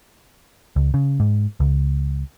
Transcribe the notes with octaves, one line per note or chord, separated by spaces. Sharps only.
C#2
C#3
G#2
C#2